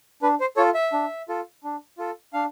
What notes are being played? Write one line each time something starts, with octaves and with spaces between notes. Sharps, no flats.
D4 B4
C5
F4 A4 C#5
E5
D4
F4 A4
D4
F4 A4
D4 F5